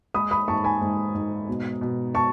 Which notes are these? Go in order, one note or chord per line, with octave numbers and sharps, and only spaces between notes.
G#3 B5 D#6
B5 D#6
G#2 A5 C#6
G#5 B5
G#2
G#2
B2
B2
B2 A5 C#6